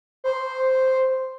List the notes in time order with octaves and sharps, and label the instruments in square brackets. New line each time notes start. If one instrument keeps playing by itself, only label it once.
[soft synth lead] C5